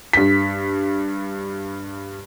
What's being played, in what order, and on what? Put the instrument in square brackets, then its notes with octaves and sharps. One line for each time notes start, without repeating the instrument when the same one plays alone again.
[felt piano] G2 B6